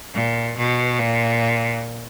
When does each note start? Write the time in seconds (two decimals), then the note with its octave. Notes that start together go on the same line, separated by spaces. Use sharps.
0.14 A#2
0.57 B2
0.98 A#2